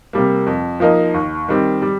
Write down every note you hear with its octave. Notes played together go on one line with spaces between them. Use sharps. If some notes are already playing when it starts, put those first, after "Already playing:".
C3 G3 A#3
F2
F3 A#3 D#4 A#4
D#2
D#3 G3 C4
G3